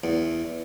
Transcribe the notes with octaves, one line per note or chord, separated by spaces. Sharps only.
E2